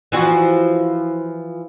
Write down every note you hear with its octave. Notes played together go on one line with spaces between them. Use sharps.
E3 F3 F#4